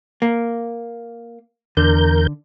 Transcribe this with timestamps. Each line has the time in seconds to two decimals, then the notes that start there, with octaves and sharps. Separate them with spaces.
0.22 A#3
1.77 E2 D3 A#4 G6